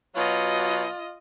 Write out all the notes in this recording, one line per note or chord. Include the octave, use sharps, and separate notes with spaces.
B2 F#3 F4 D#5